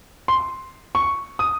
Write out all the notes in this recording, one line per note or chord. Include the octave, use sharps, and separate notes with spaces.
C6
C#6
D#6